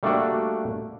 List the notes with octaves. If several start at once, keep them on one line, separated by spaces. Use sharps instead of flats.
G3 A3 A#3 D4 F#4 D5